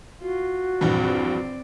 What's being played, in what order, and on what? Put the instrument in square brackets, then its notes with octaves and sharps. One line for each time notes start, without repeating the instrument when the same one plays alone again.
[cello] F4 [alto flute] F#4
[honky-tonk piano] A#1 E2 G2 [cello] C4 D5